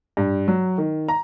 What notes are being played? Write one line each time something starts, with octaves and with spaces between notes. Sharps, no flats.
G2
F#3
D#3
A#5